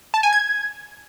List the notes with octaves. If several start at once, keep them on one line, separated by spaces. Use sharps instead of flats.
A5
G#5
G#6